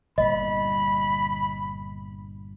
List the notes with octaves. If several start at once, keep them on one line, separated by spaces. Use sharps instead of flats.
G1 A#2 D#5 B5